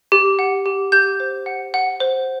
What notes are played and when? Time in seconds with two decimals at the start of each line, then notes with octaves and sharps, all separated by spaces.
0.12 G4
0.39 F#5
0.66 G4
0.92 G4 G6
1.20 C5
1.46 F#5
1.74 F#5
2.00 C5